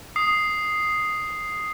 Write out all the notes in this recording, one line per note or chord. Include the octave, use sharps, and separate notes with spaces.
D#6 C7